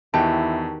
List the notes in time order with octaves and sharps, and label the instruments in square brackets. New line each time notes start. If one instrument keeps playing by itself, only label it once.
[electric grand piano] E2 [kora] D#3 F#4 G4 [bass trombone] E4 [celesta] A5